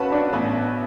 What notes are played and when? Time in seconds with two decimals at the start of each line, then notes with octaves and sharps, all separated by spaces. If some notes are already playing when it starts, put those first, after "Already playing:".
Already playing: B1 C#4 F#4 B4 F#5 A5 B5
0.12 D4 D5
0.33 A1 B3 B4